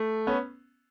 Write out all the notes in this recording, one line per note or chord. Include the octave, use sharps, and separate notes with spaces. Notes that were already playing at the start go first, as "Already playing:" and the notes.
Already playing: A3
B3 C#4